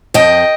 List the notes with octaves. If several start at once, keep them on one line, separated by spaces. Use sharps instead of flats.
F2 D#5 G5